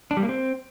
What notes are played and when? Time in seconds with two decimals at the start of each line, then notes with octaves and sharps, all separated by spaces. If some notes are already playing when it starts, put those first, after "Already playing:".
0.11 D4
0.17 G3
0.23 A#3
0.29 C4